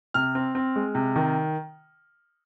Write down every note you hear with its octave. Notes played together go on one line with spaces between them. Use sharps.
C3 F6
C4
C4
G#3
C3
D#3